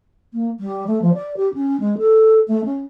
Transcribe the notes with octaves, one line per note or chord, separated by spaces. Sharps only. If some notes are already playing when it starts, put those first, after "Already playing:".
A#3
G3
A3
F3
D5
G4
C#4
G#3
A4
A3
C#4